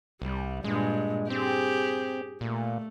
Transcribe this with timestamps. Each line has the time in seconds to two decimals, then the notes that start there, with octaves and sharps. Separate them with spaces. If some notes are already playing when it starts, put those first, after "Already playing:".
0.22 C2 G3
0.64 G2 A#2 G#3
1.30 C4 G4 G#4
2.41 A#2 A3